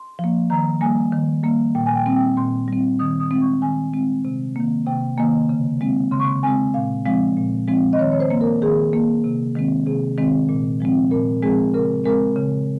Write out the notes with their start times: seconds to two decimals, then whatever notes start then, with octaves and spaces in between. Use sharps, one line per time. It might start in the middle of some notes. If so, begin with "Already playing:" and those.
Already playing: C6
0.19 F3 A#3
0.50 D#3 A#5
0.81 G3 A#3 G#5
1.12 D#3
1.43 G3 A#3
1.75 A#2 G5
1.86 G#5
1.96 G5
2.06 G3 C4
2.16 G5
2.37 A#2 C6
2.68 G3 C4
2.99 D#3 D#6
3.20 D#6
3.31 G#3 C4
3.41 C#6
3.62 D#3 G#5
3.93 G#3 C4
4.25 C3
4.56 D#3 A#3
4.87 C3 G5
5.18 D#3 A#3 G#5
5.49 C#3
5.81 G#3 C4
6.12 C#3 C6
6.20 C#6
6.27 C6
6.43 G#3 C4 G#5
6.74 A#2 F5
7.06 F3 G#3 C4 F5
7.37 A#2
7.68 F3 G#3 C4
7.93 D#5
7.99 D#3 C#5
8.12 C#5
8.20 C5
8.30 A#3
8.41 A#4
8.62 D#3 G#4
8.93 A#3
9.24 C3
9.55 D#3 G#3 C4
9.86 C3 G#4
10.18 D#3 G#3 C4
10.49 A#2
10.80 F3 G#3 C4
11.11 A#2 A#4
11.43 F3 G#3 C4 G#4
11.74 C#3 A#4
12.04 G#3 C4 A#4
12.36 C#3